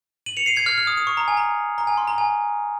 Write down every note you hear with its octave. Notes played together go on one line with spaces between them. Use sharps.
D#7 F#7
C#7 F7
C7 D#7
G#6 C7
F6 G#6
F6
D#6
D#6
C#6
A#5
G#5
A#5
A#5
G#5
C6
A#5
G#5